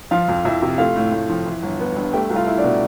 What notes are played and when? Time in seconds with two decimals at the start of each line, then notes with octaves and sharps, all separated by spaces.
0.11 F3 F4 F5
0.28 F2
0.45 F2 E4 E5
0.62 C3
0.78 A3 F4 F5
0.96 A2
1.12 A2
1.29 F3
1.46 E3
1.62 G1
1.80 B3
1.96 G2
2.13 A3 G4 G5
2.30 C2
2.35 F4 F5
2.47 E4
2.58 D4 D5
2.64 B2